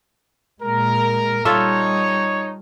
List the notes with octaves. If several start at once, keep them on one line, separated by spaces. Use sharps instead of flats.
A#2 G#3 A#4
G3 D#4 F4 A4 C#5 E5